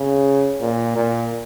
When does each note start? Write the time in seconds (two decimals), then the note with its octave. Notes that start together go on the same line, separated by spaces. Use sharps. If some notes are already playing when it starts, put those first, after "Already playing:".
Already playing: C#3
0.61 A#2
0.96 A#2